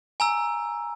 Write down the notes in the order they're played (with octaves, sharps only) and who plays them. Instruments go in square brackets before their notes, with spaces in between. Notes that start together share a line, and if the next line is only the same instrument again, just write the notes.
[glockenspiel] G#5 A#5 E6